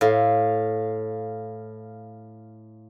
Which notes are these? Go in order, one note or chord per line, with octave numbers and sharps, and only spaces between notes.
A2 F5